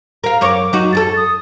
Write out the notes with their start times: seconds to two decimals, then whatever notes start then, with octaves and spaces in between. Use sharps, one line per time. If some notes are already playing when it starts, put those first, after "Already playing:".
0.24 A#4 F5 A#5
0.41 F#2 A#4 C#5 D6
0.73 F#3 D#4 F#4
0.93 F#2 G4 A4 A6
1.17 D#6